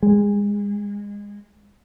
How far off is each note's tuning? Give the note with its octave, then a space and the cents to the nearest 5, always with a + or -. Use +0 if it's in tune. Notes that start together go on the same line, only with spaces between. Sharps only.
G#3 -25